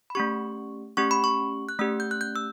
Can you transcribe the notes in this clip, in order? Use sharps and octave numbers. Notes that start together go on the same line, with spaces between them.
B5
A3 C#4 G4 C#6
A3 C#4 G4 C#6
B5
C#6
F#6
A3 C#4 G4 E6
G6
F#6
G6
E6